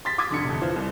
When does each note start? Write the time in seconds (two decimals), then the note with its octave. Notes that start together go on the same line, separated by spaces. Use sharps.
0.05 C6 A6 B6
0.18 C6 D6 D#6 G#6 A6
0.30 F1 D3 C#7
0.45 F2 C3
0.61 E3 F4 C5
0.76 C2